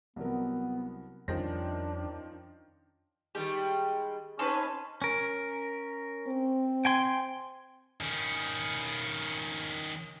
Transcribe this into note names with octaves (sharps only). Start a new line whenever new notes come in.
C2 F#3 B3 A#4
F2 D#3 F3 G3 C#4 D4 C5 A#6
D#3 G3 G#3 G4
C4 C#4 D#4 B4 A5 C6
C#4 A#4
C4
G5 G#5 C6
D#3 C#4